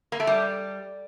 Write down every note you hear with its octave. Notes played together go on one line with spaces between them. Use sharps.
A#3
A3
G3